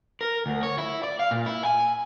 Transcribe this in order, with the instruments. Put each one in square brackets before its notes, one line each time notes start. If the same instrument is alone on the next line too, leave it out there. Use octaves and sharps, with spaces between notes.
[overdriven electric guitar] A#4
D2
C#5
E4
D5
F5
A#2
E4
G#5